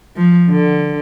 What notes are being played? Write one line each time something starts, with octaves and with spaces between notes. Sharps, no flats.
F3
D3